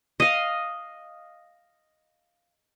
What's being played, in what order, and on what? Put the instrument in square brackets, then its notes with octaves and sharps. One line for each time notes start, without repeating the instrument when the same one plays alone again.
[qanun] D#5 F5